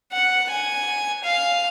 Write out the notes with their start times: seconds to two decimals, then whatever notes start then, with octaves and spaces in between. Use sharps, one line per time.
0.13 F#5
0.50 G#5
1.24 F5